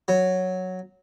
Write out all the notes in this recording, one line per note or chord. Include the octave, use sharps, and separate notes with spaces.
F#3